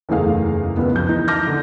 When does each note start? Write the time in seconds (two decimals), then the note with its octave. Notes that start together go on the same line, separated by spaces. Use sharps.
0.09 F#1 E2 A3 D#4 G#4 F5
0.76 C#2 D#3 B3
0.96 F2 G6
1.08 E3 D#4
1.28 A5 D6 F6 G6 A#6
1.47 D3